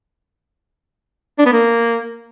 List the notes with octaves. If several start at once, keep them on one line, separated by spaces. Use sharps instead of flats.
D4
B3
A#3